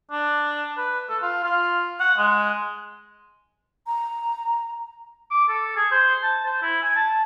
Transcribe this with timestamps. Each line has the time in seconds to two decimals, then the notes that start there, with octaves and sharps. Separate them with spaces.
0.11 D4
0.77 B4
1.09 A4
1.22 F4
1.43 F4
2.00 F#5
2.18 G#3
3.87 A#5
5.31 D6
5.49 A4
5.76 G#4
5.91 C5
6.23 A5
6.45 C5
6.62 E4
6.82 G#5
6.96 A5